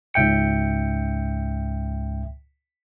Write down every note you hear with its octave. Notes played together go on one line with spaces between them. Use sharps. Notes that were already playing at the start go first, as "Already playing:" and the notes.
C#2 G#2 E5 G5 C#7